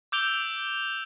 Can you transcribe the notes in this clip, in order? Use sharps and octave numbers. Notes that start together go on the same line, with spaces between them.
D6 E6 G6 D7 F7 G7